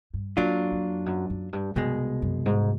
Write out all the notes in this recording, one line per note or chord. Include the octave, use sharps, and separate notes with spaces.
G2
F#2 F#3 A#3 D4 F4
F2
F#2
F#2
G2
C2 F#2 B2 G#3
F#2
G#2